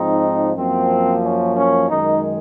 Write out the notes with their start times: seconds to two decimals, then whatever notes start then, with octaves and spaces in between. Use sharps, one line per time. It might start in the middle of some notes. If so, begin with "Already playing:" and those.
Already playing: G#2 F3 C4 D#4
0.57 F#2 F3 A#3 C4
1.24 C#4
1.57 C#4
1.90 F#2 D#3 G#3 D#4